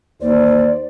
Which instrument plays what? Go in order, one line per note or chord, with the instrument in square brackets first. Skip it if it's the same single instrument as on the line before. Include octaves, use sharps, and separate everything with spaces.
[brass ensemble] D#2 C5 [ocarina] D5